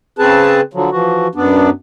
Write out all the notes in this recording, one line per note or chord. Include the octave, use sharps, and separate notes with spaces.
C#3 C4 G#4 B4 A5
D3 F3 F#3
E3 F3 F#4
F#2 B3 D4